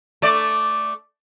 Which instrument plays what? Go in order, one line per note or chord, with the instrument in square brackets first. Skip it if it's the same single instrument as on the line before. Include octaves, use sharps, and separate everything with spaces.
[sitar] A3 D5